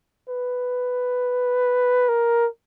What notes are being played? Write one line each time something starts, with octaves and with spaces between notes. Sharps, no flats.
B4
A#4